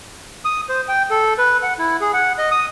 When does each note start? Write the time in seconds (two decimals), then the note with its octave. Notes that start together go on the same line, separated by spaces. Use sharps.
0.45 D#6
0.69 C5
0.88 G5
1.10 A4
1.38 B4
1.63 F#5
1.79 E4
2.01 G#4
2.14 F#5
2.38 D#5
2.51 D#6